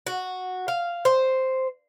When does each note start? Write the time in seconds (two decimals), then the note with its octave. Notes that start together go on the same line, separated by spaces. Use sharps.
0.07 F#4
0.68 F5
1.05 C5